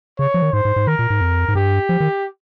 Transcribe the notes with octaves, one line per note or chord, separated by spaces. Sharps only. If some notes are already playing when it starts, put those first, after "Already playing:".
C#3 C#5
F3
D#3
G#2 C5
G#2
G#2
D#3 A#4
A#2
G#2
F2
G#2
G2 G4
F3
D#3